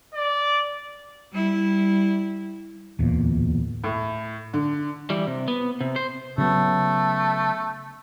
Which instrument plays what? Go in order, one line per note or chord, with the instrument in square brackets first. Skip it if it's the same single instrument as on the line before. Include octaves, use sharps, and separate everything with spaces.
[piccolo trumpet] D5
[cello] G3 E4
[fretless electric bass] D1 E2 A#2
[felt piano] A2
D3
[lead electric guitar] E3 G3
C3
B3
C3
C5
[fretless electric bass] C#3 F#3 B3 [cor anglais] A3